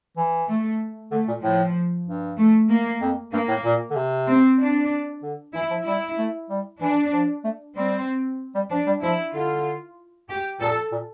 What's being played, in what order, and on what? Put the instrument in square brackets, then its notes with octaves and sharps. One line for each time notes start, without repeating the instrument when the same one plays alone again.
[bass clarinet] E3
[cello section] A3
[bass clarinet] D3 [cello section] A3
[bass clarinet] A#2
[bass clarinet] A2 [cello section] F3
[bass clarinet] G2
[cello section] A3
A#3
[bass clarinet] F2
[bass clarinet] G2 [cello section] A#3
[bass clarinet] A2
A#2
D3
C3
[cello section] C4
D4
[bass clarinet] D3
[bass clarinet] E3 [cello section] E4
[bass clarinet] F3
[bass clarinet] G3 [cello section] E4
[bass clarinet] A3
G3
[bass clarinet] E3 [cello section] D4
[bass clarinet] F3
A3
[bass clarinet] G3 [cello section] C4
[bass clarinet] G3
[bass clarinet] F3 [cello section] D4
[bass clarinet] G3
[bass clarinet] F3 [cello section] E4
[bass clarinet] D3 [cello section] F4
[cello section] G4
[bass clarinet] A#2 [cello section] A4
[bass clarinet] A#2